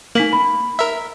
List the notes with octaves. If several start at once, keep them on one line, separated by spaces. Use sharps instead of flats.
A#3 D#4 B6 F#7
B5
A#4 E5